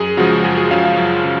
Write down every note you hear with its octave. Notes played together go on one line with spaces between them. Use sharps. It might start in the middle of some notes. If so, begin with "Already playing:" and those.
Already playing: F#2 G#4
C#3 F3 G#3 F#4
F#2 G#4
G#4
C#3 F3 G#3 F5
F5
F#2
C#3